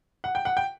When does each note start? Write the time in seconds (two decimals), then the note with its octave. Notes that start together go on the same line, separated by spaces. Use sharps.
0.24 F#5
0.35 G5
0.45 F#5
0.57 G5